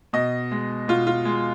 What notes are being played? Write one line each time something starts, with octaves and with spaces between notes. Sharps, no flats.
B2 D#5
G#3
B2 F4
F4
G#3